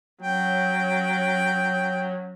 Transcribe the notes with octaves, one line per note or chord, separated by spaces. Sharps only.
F#3 C#4 G5